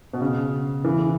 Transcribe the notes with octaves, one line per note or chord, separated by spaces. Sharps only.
B2
C#3
C#3 E3